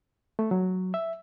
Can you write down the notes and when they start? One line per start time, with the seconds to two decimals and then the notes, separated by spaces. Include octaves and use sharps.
0.39 A3
0.51 F#3
0.94 E5